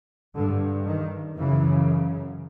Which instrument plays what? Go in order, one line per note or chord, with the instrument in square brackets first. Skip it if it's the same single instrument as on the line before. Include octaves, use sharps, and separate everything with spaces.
[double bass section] G2 D3
D#3
F#2 C#3 E3